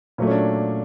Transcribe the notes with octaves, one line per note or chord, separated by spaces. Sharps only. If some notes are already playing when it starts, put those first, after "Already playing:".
A#2 F#3 A3
C#4
D4